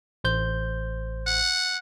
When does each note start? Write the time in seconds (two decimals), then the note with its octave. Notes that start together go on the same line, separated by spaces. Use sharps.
0.24 A1 C5 G6
1.27 F#5